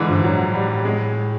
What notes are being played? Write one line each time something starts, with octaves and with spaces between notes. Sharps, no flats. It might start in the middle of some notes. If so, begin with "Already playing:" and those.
Already playing: G#2 D3 E3
G2 F3
A2 F#3
G3
G#3